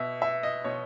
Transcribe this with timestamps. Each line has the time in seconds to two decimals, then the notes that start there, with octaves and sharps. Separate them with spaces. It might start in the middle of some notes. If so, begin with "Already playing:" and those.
Already playing: B2 E5
0.22 E5
0.43 D#5
0.64 B2 C#5